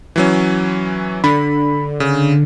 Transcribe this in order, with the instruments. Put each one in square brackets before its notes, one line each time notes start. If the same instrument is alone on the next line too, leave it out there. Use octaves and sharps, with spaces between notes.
[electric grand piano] E3 F#3 C#4
[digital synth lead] D3 [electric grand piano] B5
[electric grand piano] C#3